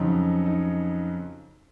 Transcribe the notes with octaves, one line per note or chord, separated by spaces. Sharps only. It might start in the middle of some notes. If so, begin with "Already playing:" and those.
Already playing: F2 C#3 F#3 D#4
D#4